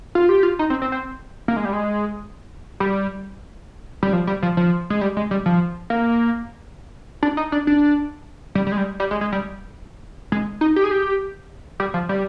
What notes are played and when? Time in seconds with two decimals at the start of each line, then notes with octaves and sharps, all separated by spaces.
0.15 F4
0.29 G4
0.43 F4
0.59 D#4
0.70 C4
0.82 C4
0.92 C4
1.48 A#3
1.56 G#3
1.65 G3
1.73 G#3
2.80 G3
4.03 G3
4.13 F3
4.27 G3
4.43 F3
4.57 F3
4.90 G#3
5.01 G3
5.17 G#3
5.31 G3
5.46 F3
5.90 A#3
7.23 D4
7.37 D#4
7.52 D4
7.67 D4
8.55 G3
8.67 G3
8.72 G#3
8.78 G3
9.00 G3
9.11 G#3
9.21 G#3
9.32 G3
10.32 G#3
10.61 D#4
10.76 G4
10.84 G#4
10.91 G4
11.80 G3
11.94 F3
12.09 G3